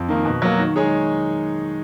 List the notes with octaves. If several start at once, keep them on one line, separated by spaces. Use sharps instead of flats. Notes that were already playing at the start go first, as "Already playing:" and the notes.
Already playing: F2
D#3 A#3 D#4
B2
F#3 A#3
D#3
G#3 D#4 G#4 C#5